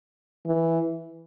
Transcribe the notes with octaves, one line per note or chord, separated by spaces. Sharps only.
E3